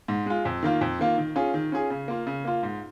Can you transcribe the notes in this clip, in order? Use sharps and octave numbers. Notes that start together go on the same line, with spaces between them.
G#2
G#3 F4
F2
D#3 A#3 F4
F2
D#3 A#3 F4
D#3
C#4 F4 G#4
D#3
C#4 F4 G#4
C#3
A#3 F4
C#3
A#3 F4
G#2